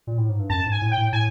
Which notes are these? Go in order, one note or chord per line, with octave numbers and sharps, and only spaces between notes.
A#2
A2
G#2
G2
F#2 A5
G#2
G#5
A2
G5
A2
A2 G#5